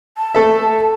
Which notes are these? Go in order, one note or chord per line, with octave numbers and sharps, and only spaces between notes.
A5
A3 A4 E5